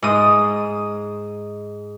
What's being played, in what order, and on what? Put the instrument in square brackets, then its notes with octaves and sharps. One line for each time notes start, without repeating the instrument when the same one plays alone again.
[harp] G#2 D#6